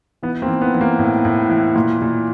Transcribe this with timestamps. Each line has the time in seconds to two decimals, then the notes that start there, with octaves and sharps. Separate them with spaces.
0.23 E3 B3
0.42 A#3 C4
0.48 E3
0.61 B3
0.74 E3
0.81 A#3
0.99 A2
1.25 A2
1.50 E3
1.75 A#2
2.02 A#2